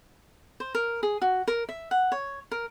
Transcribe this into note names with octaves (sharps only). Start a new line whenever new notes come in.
C5
A#4
G#4
F#4
A#4
E5
F#5
C#5
A#4